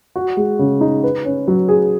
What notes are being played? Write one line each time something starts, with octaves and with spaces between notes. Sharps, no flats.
F#4
G#3
C#3
D#4
B4
C#4
F#3
G#4